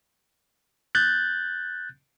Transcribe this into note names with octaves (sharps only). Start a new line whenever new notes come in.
F#6 G6 A6